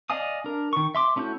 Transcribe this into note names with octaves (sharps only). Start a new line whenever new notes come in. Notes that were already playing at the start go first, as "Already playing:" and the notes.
D5 D#5 F5 G#5 D#6
D4 A#4
D#3 C#6
E5 C6 D6
A3 C#4 E4 F#4 G6